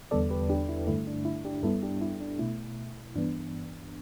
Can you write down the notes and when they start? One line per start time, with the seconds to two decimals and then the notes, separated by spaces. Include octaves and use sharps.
0.11 E2 D3 G3 B3 A4 D5
0.30 G4 B4
0.49 D4 G4
0.69 E4
0.87 G2 D3 A3 E4
1.07 D4
1.25 E4
1.45 D4 G4
1.63 G2 G3 B3 E4 A4
1.83 D4 G4
2.01 E4
2.20 D4
2.39 B2 A3 E4
3.16 G2 E3 B3 D4